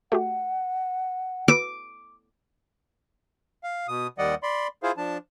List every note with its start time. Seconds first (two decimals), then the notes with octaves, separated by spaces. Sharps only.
0.12 A3 F#4 G4 F#5
1.48 F#4 B4 D6 E6
3.64 F5
3.88 B2 D#6
4.18 D#2 D#3 G3 D5 D#5 F#5
4.43 D5 B5 C6
4.83 E4 F4 G#4 C5 F5
4.97 F3 D4 A5